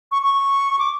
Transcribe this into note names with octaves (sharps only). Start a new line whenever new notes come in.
C#6
C#6
D6